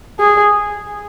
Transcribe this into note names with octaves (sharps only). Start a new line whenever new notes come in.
G#4